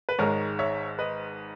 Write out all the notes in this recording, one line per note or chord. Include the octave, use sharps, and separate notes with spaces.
B4
G#1 G#2 D#3 G#3 A#4 C#5
C#5 E5
B4 D#5